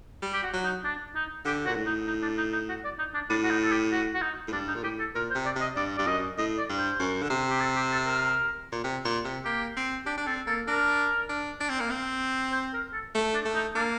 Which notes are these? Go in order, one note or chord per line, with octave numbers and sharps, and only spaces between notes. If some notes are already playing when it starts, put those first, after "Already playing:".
G3
G4
F#4
F#3
D#4
D4
D#4
D3 G4
A#2 F#4
A2
D#4
D#4
D4
D#4
D#4
F#4
D5
D#4
D4
A2 D4
F#4
D#4
A4
G4
F#4
F#4
D#4
A2
G2 D4
D#4
A#2
A2 G4
A4
A#2 A#4
C5
C3
D5
C3
D#5
G2 D5
G2 D5
F#2 D#5
A2 D#5
D5
G2
C5
F#2
D3
C3
G4
A4
G4
A4
A#4
A#2
C3
A#2
C3
A#3 G4
C4
D4 G4
D4
C4 A4
A#3 A4
D4 A#4
D4
D4
C4
A#3
C4
C5
A#4
A4
A3
D4
A3
D#4
A#3 D4